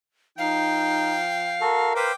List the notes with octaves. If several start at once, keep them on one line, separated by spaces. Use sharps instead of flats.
F3 D#4 F5 G5
F#4 A4 A#4
B4 C5 F5 G5 D6